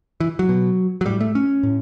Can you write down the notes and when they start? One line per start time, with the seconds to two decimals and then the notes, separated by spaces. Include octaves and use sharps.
0.20 E3
0.39 F#3
0.49 B2
1.01 F#3
1.06 A2 G3
1.20 A3
1.35 C#4
1.63 A2